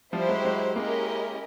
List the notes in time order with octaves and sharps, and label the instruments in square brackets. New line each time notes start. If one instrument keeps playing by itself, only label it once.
[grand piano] F3 G3 [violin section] E4 G4 C5
[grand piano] F#3 G#3
F#3 G#3
[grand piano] G#3 A#3 [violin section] C#4 E4 G4 A#4 D#5